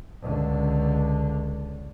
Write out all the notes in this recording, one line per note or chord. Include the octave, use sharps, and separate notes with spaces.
C#2 D3